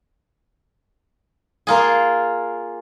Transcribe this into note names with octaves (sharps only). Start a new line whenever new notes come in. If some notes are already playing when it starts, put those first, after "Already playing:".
A#3 F4 G#4